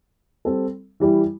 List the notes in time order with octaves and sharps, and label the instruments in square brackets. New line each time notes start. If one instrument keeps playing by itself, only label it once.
[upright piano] G3 C4 A4
E3 G3 E4 G4